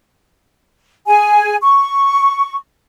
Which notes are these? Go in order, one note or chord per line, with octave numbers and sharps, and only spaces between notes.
G#4 G#5
C#6